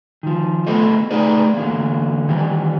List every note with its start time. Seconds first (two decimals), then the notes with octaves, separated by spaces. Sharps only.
0.23 D#3 F3
0.67 A3 B3 E4 A4 C5 D#5
1.11 A3 D#4 G#4 B4 C5 D5
1.54 D3 E3 A#3
2.28 D#3 E3 G3